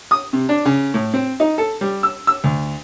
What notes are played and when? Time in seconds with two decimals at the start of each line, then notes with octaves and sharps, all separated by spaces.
0.11 D#6
0.33 C3
0.49 D4
0.65 C#3
0.94 A2
1.14 C4
1.40 D#4
1.58 A4
1.81 G3
2.03 E6
2.27 E6
2.44 D2